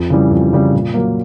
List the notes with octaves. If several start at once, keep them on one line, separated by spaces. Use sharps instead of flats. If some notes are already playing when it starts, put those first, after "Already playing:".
Already playing: F2
C#3 E3 G3
F2
C#3 E3 G3
A#2
F#3 A#3